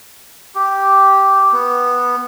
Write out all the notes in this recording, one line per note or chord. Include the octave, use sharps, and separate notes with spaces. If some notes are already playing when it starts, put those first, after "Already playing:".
G4
B3